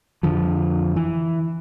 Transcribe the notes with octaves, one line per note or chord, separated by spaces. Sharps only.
F2 D3 F3
E3